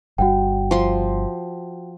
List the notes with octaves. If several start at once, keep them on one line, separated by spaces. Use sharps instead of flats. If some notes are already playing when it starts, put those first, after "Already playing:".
G1 G3 F#4 F#5 G5
F3 C6